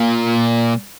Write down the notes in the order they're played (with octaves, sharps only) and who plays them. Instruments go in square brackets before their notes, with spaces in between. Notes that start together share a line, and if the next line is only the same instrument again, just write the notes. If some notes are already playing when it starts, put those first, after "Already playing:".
Already playing: [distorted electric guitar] A#2